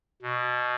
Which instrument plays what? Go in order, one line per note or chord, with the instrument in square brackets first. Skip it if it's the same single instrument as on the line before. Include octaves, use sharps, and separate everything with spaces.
[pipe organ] B2